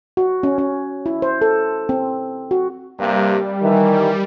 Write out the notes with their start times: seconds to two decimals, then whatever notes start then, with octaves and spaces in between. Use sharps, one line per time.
0.17 F#4
0.43 C#4
0.58 C#4
1.06 E4
1.22 C5
1.41 A4
1.89 C4
2.51 F#4
2.99 G2 C3 G3 A#3
3.62 D#3 E3